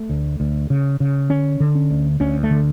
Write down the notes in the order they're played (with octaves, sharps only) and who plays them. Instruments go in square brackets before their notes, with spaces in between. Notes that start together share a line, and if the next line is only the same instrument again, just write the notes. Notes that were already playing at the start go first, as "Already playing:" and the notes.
Already playing: [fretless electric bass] A3
D2
D2
C#3
C#3
D3 C#4
D3
C#4
D2
D2 C#4
A3
D3